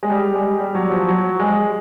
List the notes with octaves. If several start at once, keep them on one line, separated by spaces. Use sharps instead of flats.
G#3
G3
G#3
G3
F#3
F3
F#3
G#3